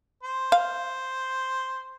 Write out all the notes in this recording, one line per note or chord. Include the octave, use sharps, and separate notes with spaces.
C5
F5